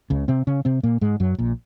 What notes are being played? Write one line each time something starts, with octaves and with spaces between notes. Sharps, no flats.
C#2 C#3
C3 C4
C#3 C#4
C3 C4
A#2 A#3
G#2 G#3
F#2 F#3
A#1 A#2